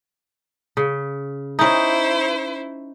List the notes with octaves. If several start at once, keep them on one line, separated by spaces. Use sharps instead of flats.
C#3
C#4 D#4 E4 C5